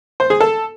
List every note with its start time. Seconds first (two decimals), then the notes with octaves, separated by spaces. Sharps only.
0.20 C5
0.30 G#4
0.40 A4